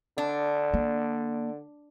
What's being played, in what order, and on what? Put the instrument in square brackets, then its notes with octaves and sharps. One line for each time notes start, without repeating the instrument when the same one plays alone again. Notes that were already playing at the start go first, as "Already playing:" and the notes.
[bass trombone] D3 [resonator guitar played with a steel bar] D4
[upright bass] A#3